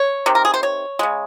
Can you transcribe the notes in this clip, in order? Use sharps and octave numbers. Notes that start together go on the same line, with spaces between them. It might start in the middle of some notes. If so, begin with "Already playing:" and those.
Already playing: C#5
C3 D#3
A#4
G#4
C5
C#5
C#3 G#3